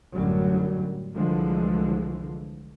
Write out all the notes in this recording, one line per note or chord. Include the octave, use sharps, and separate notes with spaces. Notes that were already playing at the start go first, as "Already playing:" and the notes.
A1 F#2 D3 F#3 G3
C2 D3 E3 F3 G#3